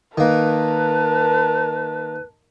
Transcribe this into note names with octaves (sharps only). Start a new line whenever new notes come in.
D#3 A#3 A#4 B4 A5